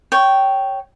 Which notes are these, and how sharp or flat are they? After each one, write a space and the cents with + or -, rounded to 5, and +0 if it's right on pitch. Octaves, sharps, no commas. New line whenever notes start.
C#5 +0 G5 -10